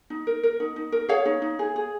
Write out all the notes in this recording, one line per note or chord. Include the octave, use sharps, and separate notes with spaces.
D#4
A#4
A#4
D#4
D#4
A#4
G#4 C#5 F5
D#4
D#4
G#4
G#4